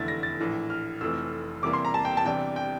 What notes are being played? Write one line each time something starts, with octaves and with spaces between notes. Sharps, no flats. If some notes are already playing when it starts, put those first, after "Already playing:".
Already playing: F1 E2 D3 A3 E4 A6
A#6
A6
A#1 A2 E3
F6
F1 F2 E3 A3 E6
E2 C3 G3 A#3 E4 D6
C6
A#5
A5
G5
A5
E2 C3 E3 G3 D4 G5
G5